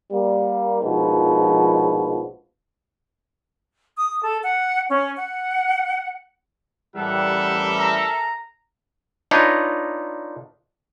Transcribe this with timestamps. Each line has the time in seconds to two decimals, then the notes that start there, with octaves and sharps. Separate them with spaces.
0.11 G3 A#3
0.82 A#1 G#2 B2 F3
3.96 D#6
4.23 A4
4.43 F#5
4.89 C#4
5.16 F#5
6.96 A1 E3 G3 A4 A#4 E5 F#5
7.77 A#5
9.31 D4 D#4 F4 B4 C#5 D#5